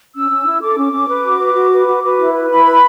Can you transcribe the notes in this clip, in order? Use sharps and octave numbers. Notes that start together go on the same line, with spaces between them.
C#4 E6
C#4
E4
A4 D6
C#4
C#4
B4
F#4
B4
F#4
B4
F#4
B4
E4
B4
E4 B5
B4